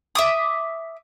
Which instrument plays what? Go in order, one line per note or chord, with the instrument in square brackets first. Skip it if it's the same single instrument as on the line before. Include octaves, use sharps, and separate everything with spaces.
[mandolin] E5 D6 D#6